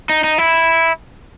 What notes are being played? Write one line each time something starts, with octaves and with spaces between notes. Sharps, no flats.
D#4
D#4
E4